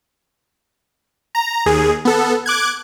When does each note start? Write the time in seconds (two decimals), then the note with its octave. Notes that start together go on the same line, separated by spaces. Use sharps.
1.35 A#5
1.66 D#2 G#4
2.05 B3 A4
2.46 D6 F#6 G#6